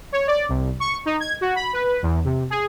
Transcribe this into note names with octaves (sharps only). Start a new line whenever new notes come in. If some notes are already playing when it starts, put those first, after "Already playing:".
C#5
D5
C2
C#6
D#4
G#6
F#4
B5
B4
E2
C3
G#4